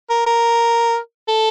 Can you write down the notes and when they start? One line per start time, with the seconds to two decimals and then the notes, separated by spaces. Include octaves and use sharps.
0.10 A#4
0.26 A#4
1.28 A4